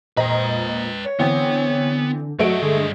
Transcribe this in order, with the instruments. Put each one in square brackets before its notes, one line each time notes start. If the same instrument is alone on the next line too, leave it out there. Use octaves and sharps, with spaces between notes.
[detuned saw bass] A#2 [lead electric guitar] B4 G5 [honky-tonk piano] C5 D#5 A#5
[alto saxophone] C#5
[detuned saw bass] D3 [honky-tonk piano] E3 C4 [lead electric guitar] B3
[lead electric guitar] G2 D#5 [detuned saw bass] F#3 [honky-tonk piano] A3 A4 D7 [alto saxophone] F#4
[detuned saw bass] D3 [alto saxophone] G#3